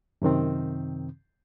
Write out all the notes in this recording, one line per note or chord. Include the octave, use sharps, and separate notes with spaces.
F#2 C3 D#3 C4